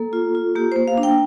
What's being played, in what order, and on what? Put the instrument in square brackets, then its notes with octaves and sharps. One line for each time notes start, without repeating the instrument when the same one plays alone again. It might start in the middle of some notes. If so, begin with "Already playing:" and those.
Already playing: [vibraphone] A#3 A4
F4
F4
A#3 G4
A#3 C5
F5
D4
G5